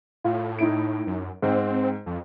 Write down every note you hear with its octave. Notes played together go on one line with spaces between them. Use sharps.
A2 F4
D#4 E4 D7
F#2
G#2 C4
F2